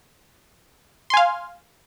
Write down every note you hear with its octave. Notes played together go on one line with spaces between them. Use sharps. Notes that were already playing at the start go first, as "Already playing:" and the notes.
F5 G#5 C6